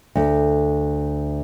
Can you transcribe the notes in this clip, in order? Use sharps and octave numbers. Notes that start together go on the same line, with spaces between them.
D2